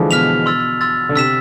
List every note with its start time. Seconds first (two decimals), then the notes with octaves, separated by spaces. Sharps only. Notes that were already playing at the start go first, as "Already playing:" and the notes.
Already playing: D3 E3 F3 G#3
0.10 B2 F6 B6 F7
0.46 C6 E6 A6
0.81 C6 E6 A6
1.09 D3
1.15 C3 E6 B6 E7